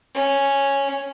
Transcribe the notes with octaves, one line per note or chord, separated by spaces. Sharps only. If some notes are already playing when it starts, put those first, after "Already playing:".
C#4